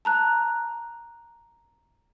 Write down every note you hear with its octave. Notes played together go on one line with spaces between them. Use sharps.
A5 A#5 F#6